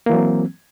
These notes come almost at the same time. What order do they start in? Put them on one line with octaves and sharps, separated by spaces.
A#3 E3 F#3 C4